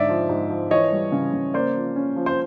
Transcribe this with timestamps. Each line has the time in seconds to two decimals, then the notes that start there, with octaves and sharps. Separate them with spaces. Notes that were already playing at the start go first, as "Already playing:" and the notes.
Already playing: G#2 D3 D5 E5
0.09 F3
0.29 G#2
0.50 F3
0.70 E3 C#5 D#5
0.92 G3
1.12 C#3
1.33 C#3
1.54 A#3 C5 D5
1.75 F3
1.96 C#4
2.16 F3
2.26 C5